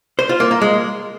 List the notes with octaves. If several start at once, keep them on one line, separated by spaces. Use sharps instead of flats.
C5
F4
A#3
A#3
G#3